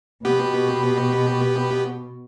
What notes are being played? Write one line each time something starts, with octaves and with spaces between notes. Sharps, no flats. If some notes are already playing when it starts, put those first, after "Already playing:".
B2 B3 G4